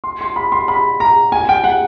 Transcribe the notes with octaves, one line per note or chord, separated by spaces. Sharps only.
C6
C6
B5
C6
B5
A#5
G#5
G5
F#5